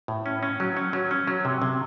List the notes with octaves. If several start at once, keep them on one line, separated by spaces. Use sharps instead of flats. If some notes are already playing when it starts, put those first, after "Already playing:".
A2
C#4
C#4
F#3
C#4
F#3
C#4
F#3
C3
C3